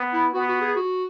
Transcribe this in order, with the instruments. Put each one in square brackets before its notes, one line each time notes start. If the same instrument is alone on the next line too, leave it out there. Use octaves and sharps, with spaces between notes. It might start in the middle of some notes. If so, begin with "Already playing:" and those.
Already playing: [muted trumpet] B3
[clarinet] E4
[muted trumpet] B3 [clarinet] F#4
[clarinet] F#4
G#4
F#4